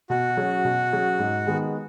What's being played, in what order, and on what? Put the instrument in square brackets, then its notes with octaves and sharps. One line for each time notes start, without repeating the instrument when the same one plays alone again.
[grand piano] B2 [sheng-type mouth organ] F#4
[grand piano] F#3 C#4 G#4
B2
F#3 C#4 G#4
G#2
D#3 G#3 B3